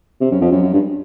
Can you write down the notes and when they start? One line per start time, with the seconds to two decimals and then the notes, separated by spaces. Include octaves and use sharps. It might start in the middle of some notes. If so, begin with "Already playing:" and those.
0.21 C3
0.31 F#2
0.41 F2
0.52 F#2
0.62 F#2
0.73 G2